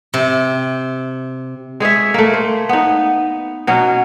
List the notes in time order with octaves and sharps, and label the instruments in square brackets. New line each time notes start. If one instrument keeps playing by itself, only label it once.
[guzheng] C3
[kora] G#3 G#4 C#5 E5
A3 A#3
C5
B3 D#4
B2 F#3 C#4